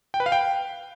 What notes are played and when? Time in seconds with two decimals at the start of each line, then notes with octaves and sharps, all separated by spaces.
0.14 G5
0.20 B4
0.26 F5
0.32 G5